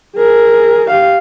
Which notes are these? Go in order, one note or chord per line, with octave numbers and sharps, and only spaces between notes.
G#4 A#4
G4 F5